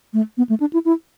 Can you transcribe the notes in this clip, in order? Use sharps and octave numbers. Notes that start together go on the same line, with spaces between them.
A3
B3
A3
D4
E4
E4